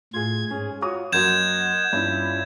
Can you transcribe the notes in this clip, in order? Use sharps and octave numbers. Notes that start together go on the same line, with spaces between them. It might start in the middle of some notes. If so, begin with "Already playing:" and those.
A2 F4 G#4 G#6
G#2 C#4 G#4
F4 F#4 C#5 D#6
F#2 A#3 F#4 D#5 F#5 G6 G#6 E7
G2 C#4 E4 F4